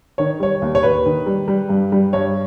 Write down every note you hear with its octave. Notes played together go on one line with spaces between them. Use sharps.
D#3 C#5
G3 C#5
D#2
C#5
D#2 B4
D#3
G3
G3
G2
G3
G2 C#5